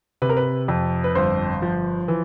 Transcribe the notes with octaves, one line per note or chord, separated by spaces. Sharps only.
C3 B4
A#4
B4
F2
B4
G1 C5
F3
E3